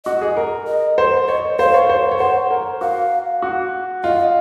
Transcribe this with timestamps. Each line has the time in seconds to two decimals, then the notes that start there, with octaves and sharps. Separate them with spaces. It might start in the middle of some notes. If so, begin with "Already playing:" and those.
0.05 F#4 D#5
0.21 G#4
0.37 A#4
0.67 D#5
0.98 C5
1.28 C#5 D#5
1.59 C5 F5
1.74 C#5
1.90 C5
2.11 C#5
2.20 C5 F#5
2.51 A#4
2.81 F#4 F5
3.42 F#4
4.04 F4 D#5